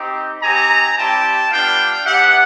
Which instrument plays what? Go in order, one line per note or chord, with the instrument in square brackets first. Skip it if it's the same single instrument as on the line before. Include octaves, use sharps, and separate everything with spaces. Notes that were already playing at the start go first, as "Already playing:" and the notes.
Already playing: [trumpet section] C4 D#4 G4
C4 D#4 G4 G#5 A#5
G3 C4 E4 G4 G5 A5
G3 B3 D4 F4 F5 G5
B3 D4 G4 E5 F#5